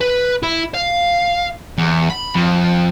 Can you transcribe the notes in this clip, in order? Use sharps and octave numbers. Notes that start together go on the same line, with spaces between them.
B4
E4
F5
E2
B5
F2